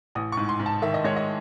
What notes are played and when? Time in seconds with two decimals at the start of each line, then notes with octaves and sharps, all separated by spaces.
0.15 A1 D#6
0.32 G#2 C#6
0.49 C6
0.60 G#2
0.66 A5
0.82 D#3 E5
0.94 D#5
1.04 G#3 C#5
1.16 D#5